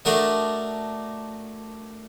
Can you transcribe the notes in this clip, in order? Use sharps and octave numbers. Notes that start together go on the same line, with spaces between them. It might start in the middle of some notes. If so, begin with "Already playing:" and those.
A3 D4 F#4 A#4 D#5